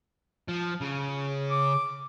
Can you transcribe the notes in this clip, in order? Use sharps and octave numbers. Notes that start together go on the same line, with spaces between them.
F3
C#3
D6